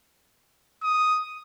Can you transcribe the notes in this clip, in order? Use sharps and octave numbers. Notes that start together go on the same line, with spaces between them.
D#6